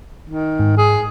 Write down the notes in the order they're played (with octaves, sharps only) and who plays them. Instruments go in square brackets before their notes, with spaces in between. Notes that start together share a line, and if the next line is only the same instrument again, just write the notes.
[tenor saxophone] D#3
[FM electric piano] G#2
[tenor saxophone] G#4